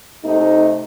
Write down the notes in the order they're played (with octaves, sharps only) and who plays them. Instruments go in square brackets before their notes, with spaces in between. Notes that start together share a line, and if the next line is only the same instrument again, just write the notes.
[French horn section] C3 A3 D#4